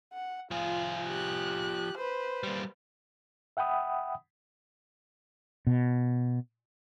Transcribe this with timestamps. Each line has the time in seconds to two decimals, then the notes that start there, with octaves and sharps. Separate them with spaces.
0.13 F#5
0.51 F3 F4 G#4
1.07 G4 F#6
1.97 B4 C5
2.43 G3 A#3
3.57 E5 F#5 G5 B5 D#6
5.67 B2